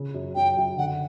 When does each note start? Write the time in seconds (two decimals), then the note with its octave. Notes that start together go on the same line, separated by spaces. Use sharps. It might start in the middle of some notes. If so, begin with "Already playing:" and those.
Already playing: C#3
0.14 F#2
0.35 F#2 G5
0.57 F#2
0.77 D3 F#5